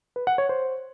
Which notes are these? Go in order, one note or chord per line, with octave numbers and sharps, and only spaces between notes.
B4
F#5
C#5
C5